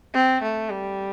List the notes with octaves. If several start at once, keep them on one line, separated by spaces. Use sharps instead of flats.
C4
A3
G3